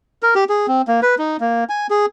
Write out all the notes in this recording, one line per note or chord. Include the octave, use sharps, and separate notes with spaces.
A#4
G4
G#4
C4
A#3
B4
D#4
A#3
G#5
G#4